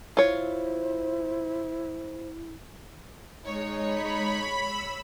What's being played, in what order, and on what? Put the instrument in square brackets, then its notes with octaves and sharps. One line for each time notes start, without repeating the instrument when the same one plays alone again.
[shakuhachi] E4 [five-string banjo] F4 C#5 [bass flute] C5
[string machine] G#3 [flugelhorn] D#4 [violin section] C#5
[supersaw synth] B5
[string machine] E6